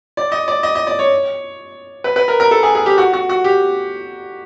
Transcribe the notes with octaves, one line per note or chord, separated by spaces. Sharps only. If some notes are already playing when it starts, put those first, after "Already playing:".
D5
D#5
D5
D#5
D#5
D5
C#5
B4
B4
A#4
A#4
A4
G#4
G#4
G4
F#4
F#4
F#4
G4